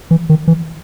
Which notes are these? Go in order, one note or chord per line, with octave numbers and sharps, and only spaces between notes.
E3
D#3
E3